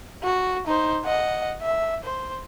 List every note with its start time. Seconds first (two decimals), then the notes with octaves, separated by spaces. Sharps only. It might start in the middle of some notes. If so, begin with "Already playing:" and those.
0.23 F#4
0.67 D#4 C5
1.05 D#5 F#5
1.62 E5
2.04 C5